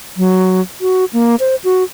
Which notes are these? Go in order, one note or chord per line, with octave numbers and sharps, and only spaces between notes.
F#3
F#4
A#3
C5
F#4